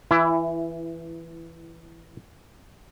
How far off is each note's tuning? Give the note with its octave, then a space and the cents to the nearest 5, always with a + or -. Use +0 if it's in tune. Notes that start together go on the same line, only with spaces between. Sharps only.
E3 +0 E4 +20